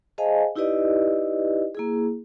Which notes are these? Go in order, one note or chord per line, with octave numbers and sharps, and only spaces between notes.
G#4 C5 D#5 F5 G#5 A5
D#4 E4 G4 B4 D5 D#5
A#3 E4 G#4